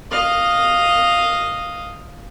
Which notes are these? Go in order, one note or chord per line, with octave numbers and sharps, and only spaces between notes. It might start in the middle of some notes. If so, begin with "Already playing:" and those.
D#5 F5